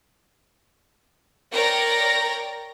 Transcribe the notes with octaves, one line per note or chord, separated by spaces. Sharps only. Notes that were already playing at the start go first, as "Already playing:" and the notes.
A#4 C#5 D5 G5 A#5 A#6